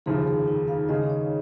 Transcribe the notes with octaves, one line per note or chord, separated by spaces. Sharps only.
F1 D#2 C#3 F3 G#4
G#4
D#4
F5
D#2 C#3 G#3 C#4 G#4 D#5
C#5